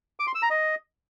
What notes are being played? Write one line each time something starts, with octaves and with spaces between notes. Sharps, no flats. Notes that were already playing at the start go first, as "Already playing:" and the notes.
D6
C6
E6
A#5
D#5